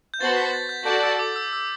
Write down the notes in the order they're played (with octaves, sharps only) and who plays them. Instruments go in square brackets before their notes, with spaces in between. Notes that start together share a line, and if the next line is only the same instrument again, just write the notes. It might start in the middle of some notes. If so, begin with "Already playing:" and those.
[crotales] G6
[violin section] B3 F#4 C5 F#5 A5 [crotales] A6
[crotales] B6
A6
G6
[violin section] F#4 A4 D5 F#5 A5 [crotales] G6
[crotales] E6
D6
E6
E6